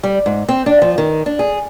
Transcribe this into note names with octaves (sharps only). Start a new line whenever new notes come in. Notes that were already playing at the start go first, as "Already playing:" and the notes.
G3
G#2
C4
D4
F3
D#3
D4
G#4